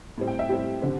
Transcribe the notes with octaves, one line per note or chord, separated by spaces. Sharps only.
A2 G3 C4
G5
E5
A2 G3 C4 G4
D3 C4